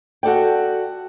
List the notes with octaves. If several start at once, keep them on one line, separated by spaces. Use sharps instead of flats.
F#4 A4 D5 G5